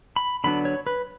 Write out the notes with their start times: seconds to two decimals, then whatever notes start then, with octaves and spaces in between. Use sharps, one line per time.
0.16 B5
0.44 D3 F#3 B3 D4 B5
0.65 C#5
0.87 B4